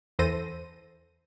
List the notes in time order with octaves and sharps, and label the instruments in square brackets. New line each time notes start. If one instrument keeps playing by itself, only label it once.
[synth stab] E2 E3 A4 C5 A#6 D#7